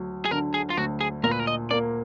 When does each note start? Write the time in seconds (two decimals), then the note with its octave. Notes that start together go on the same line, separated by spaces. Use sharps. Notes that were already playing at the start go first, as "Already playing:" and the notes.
Already playing: D2 F#3
0.25 G#4
0.31 D3 A#4
0.54 G#4
0.70 F4
0.77 D2 F#4
1.01 G#4
1.23 A#2 A#4
1.31 B4
1.40 A#4
1.47 D#5
1.71 A#3 D5